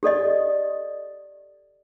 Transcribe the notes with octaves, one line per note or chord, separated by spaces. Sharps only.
G4 A4 D5 D#5